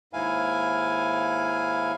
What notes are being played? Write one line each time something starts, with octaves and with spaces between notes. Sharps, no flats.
D#2 G#2 E4 F5 G#5